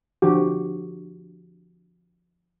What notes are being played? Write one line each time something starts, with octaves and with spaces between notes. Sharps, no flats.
D3 F3 F#4 G4